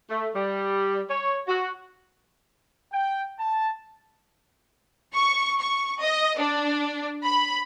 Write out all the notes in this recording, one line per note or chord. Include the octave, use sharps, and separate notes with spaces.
A3
G3
C#5
F#4
G5
A5
C#6
C#6
D#5
D4
B5